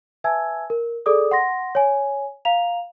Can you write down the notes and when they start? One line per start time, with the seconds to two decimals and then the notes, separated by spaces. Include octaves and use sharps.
0.24 B4 E5 G#5 A5 E6 G#6
0.70 A#4
1.06 G#4 A4 D5 D6 D#6
1.31 F#5 C6 A#6
1.75 C#5 G#5
2.45 F5 A#5 F7